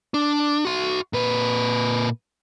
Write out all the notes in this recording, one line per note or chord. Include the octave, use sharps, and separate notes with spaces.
D4
F#4 C6
A#2 B4